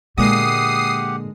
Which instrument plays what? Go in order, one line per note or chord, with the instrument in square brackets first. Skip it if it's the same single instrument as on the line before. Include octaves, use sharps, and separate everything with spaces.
[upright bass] A#2 [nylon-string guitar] D3 G#3 A#3 [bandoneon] G4 F#5 [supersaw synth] D#6 C7